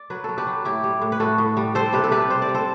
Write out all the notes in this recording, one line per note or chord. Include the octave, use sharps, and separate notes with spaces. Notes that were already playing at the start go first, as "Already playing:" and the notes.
Already playing: D5
F#3 B4
F#3 A4
G4 B4
F#3
A2 E4 G4
G3
A2
B4
A2 F#4 A4
A2
G3
G3 A4 C5
C3 G4 B4
A4
C3 G4 B4
G3 C5
D5
G3
A4 C5